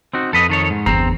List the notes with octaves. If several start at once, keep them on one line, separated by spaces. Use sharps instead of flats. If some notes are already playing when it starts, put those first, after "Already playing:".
C4 D#4 F#4
F2 A4 B4 D#5
D#3 A4 C#5
G#2
G1 E2 C4 A#5